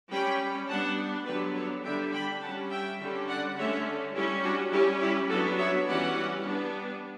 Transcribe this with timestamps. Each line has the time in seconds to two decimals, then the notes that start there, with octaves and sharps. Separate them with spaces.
0.11 G3 C#4 G5 B5
0.69 G3 B3 D4 F#5 A5
1.27 D3 F#3 B3 D4 G4 B4
1.55 A4 C#5
1.84 D3 G3 D4 E5 G5
2.13 G5 B5
2.41 G3 C#4 F#5 A5
2.70 E5 G5
3.00 D3 G3 C#4
3.28 D5 F#5
3.57 D3 A3 C#4 C#5 E5
4.14 G3 C#4 E4 G4
4.43 D4 F#4
4.72 G3 C#4 E4 G4
5.01 E4 G4
5.29 F#3 B3 D4 F#4 A4
5.58 C#5 E5
5.87 E3 G3 C#4 D5 F#5
6.45 G3 B3 D4